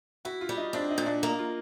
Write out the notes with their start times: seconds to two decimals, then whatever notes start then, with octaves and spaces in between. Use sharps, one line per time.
0.25 E4 F#4
0.41 F4
0.49 G3
0.57 D#4
0.73 C4 D4
0.90 D#4
0.98 A#2
1.06 D4
1.23 A#3 D#4
1.39 F4